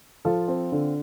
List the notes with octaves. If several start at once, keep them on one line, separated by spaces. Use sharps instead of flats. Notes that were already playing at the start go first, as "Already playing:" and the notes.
F3 F4 A4
C4
D3